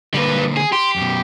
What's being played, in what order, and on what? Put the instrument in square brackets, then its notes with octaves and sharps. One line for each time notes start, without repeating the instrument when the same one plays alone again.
[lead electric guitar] D3 A#3 [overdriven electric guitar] G3 B4
[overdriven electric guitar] G#4
[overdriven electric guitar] G4 [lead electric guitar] C6
[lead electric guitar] F#2 B2